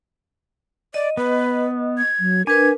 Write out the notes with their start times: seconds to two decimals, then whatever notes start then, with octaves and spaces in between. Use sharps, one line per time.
0.94 D5 D#5
1.17 B3 B4
1.98 G#6
2.20 F#3
2.47 D4 A#4 B4 G#5 G#6